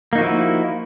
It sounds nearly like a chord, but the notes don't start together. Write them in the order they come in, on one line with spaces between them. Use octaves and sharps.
A#3 D#4 F#4 F3 E4